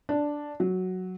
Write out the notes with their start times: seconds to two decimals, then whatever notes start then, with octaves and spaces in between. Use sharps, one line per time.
0.09 D4
0.60 F#3